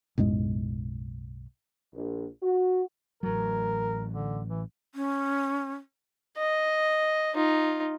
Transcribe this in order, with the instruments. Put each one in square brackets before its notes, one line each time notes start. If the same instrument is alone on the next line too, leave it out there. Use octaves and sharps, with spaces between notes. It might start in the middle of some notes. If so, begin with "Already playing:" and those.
[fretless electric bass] B1 F#2 A2 G#3
[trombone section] A#1
F#4
[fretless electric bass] A1 F#3 [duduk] A#4
[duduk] D3
E3
[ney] C#4
[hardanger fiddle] D#5
D#4 F4